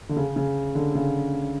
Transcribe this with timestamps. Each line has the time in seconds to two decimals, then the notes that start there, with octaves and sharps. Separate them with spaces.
0.09 D3
0.16 C#3
0.36 C#3
0.75 D3
0.95 C#3